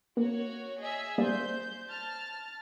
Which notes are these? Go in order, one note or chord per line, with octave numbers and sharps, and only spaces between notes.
A#3 F#4 C#5
G#4 D#5 E5
G3 A#3 C5 D5 G6
A5 F6 A6